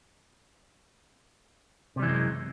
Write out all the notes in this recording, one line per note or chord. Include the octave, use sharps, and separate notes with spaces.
F#2 C3 E3 G3 G#3